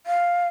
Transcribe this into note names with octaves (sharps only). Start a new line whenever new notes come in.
F5